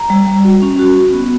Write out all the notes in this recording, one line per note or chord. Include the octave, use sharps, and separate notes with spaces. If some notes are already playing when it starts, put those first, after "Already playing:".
Already playing: A#5
G3
G3
F#4
C#4
F#4
F#4
B3